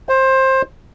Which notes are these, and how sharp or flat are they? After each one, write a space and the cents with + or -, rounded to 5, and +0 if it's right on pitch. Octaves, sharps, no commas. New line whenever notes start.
C5 +20